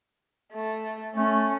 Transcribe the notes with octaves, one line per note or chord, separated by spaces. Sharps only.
A3
A3 C#4 A4